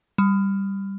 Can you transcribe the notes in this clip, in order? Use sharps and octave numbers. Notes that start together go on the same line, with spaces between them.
G3